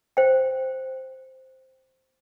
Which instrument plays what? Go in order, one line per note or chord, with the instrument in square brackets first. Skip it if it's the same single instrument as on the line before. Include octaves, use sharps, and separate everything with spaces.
[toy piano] C5 G5